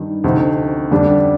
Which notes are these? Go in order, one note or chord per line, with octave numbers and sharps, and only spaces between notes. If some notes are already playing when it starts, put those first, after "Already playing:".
Already playing: G2 D#3
D2 C3 F3 C4 D#4
F2 D3 G3 D4